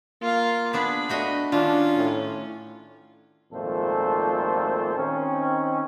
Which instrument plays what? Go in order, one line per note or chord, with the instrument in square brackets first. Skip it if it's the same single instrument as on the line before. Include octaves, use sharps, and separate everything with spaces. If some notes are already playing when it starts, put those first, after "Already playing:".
[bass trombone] A#3 [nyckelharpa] F4 F5
[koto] B3 D4 G#4 [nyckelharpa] B5
[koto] A3 F#4 D#5 [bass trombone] D4
[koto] D#3 [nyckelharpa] C#4 [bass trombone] D4 [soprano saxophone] F4
[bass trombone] A2
[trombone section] G#1 F2 A#2 A3 A4 C5
D#3 C4 C#4